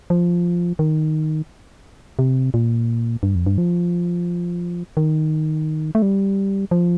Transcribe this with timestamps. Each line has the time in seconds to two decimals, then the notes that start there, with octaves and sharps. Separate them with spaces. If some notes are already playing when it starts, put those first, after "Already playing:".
0.10 F3
0.79 D#3
2.19 C3
2.54 A#2
3.23 G2
3.35 F2
3.46 G2
3.58 F3
4.97 D#3
5.95 A3
6.02 G3
6.71 F3